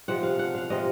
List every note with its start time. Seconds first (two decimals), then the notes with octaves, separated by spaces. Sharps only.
0.08 C3 F3 G#3 F#5
0.23 F5
0.39 F#5
0.55 F5
0.70 C3 F3 G#3 D#5